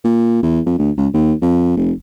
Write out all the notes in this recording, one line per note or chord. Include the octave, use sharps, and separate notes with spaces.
A#2
E2
F2
D2
C#2
D#2
F2
F1